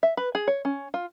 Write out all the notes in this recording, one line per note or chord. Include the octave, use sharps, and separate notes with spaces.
E5
B4
G#4
C#5
C#4
F4